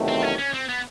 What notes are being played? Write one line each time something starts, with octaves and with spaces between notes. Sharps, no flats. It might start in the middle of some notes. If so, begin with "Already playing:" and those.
Already playing: E2 C3 D#3 F#3 A3
C4
C#4
C#4
C4
B3